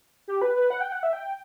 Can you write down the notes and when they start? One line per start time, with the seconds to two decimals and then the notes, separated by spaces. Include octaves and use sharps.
0.28 G4
0.42 B4
0.56 B4
0.70 F#5
0.81 G5
0.92 F#5
1.03 E5
1.13 G5